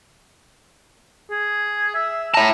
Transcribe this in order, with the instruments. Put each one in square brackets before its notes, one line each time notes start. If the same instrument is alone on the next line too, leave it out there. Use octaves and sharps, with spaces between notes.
[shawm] G#4
E5
[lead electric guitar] E4 A5 [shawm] A#5